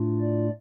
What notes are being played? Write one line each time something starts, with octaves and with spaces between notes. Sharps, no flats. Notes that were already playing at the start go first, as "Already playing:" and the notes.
Already playing: A2 A3 D4 F4
D5